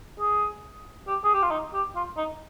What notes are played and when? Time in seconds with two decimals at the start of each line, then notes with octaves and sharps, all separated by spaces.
0.19 G#4
1.07 G4
1.24 G#4
1.34 G4
1.42 F4
1.51 D#4
1.74 G4
1.96 F4
2.17 D#4